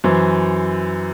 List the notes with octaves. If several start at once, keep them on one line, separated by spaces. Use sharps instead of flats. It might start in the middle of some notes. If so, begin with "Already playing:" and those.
F#2 E3 C5